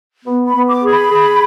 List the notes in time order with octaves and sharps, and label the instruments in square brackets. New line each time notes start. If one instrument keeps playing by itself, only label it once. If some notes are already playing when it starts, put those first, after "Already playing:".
[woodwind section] B3
[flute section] B5
[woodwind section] B3
[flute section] D6
[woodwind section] G#4
[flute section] B5
[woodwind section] G#4